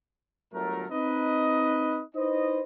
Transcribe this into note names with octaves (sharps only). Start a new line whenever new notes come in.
G1 F#3 A3 A#4
C4 D#4 B4 D#5
D#4 E4 B4 C5 D#5